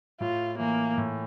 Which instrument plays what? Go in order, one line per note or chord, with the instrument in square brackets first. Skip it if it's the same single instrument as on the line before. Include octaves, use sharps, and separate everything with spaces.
[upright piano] A2 [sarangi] F4
[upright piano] E3 [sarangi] A#3
[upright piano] A2